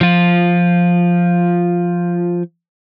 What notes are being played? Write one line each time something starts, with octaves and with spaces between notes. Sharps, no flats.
F3 F4